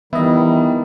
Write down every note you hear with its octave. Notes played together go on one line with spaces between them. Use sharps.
D#3 E3 G3 B3 E4 D#5